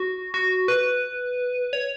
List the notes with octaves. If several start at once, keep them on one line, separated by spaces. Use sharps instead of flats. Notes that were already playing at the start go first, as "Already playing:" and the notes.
Already playing: F#4
F#4
B4
C#5